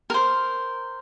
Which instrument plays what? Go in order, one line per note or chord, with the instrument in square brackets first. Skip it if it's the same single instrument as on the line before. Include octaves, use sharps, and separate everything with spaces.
[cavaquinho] A#4 C5